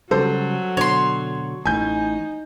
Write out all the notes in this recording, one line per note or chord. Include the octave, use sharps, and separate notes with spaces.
C#3 F#3 G3 A4 C5
B2 D3 C#5 C6
A1 A2 D#4 G#5 G6